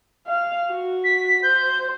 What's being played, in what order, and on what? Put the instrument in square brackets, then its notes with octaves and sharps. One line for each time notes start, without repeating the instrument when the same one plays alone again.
[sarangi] F5
F#4
[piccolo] B6
[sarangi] C5 [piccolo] G6